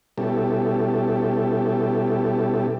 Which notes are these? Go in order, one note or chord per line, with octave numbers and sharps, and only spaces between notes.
B2 G3 C#4 E4 G4 A4